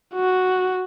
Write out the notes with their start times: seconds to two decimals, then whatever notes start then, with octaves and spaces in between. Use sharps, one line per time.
0.15 F#4